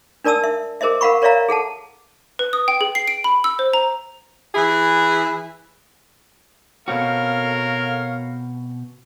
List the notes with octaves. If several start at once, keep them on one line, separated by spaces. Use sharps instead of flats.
D4 A#4 D5 A5 D#6 E6
E5
G#4 A#4 C5 D#5 E5
A#4 F5 F#5 B5 C#6
A#4 C#5 D5 E5 F5 A#5
G#4 A4 F#5 A5
B4
D#6
G5
G#4
C7
D7
B5
E6
C5
A#5
E3 E4 G#4
B2 C4 F#4 A4 A#4 C#5 F5